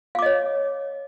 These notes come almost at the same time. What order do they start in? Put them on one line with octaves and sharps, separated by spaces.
F5 D6 D#5 C#5